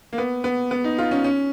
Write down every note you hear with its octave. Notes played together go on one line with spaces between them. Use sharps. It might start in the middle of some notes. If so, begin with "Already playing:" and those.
A#3
B3
B3
B3
D#4
F4
C#4
C#4